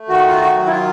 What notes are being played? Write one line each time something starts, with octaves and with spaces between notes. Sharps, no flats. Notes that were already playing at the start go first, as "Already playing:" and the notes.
Already playing: A3
D#3 F#4
F4
F#4
F#3
E4
F4